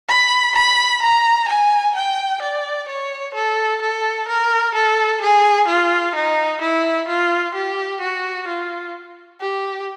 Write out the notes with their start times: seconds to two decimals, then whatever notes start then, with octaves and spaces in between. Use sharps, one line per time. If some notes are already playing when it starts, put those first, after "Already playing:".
0.08 B5
0.55 B5
1.02 A#5
1.48 G#5
1.95 G5
2.42 D5
2.88 C#5
3.35 A4
3.81 A4
4.28 A#4
4.74 A4
5.21 G#4
5.68 F4
6.15 D#4
6.61 E4
7.08 F4
7.54 G4
8.01 F#4
8.47 F4
9.41 G4